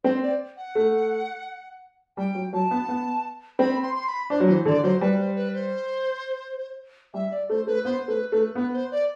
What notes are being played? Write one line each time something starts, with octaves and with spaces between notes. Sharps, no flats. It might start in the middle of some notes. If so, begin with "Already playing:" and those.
C4 C5
D5
F#5
A3
G3 G5
F#3
F#3 A5
B3
B3
C4 B5
C6
C6
B5
D4 C5
F#3
E3 C5
D3 D5
F#3 C5
G3 B4
C5
B4
C5
G3 E5
D5
A3 C5
A3 B4
B3 C5
A3 B4
A3 B4
B3 B4
C5
D5